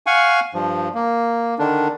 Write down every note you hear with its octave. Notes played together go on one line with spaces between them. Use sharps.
F5 F#5 G#5 C#6
G2 F3
A#3
D3 D#3 D4